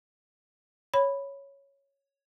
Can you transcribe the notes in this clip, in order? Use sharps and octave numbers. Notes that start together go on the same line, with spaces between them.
C#5 B5